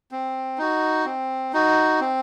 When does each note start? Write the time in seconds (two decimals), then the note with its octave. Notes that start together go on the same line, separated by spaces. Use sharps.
0.12 C4
0.58 D#4 F#4
1.05 C4
1.53 D#4 F#4
2.00 C4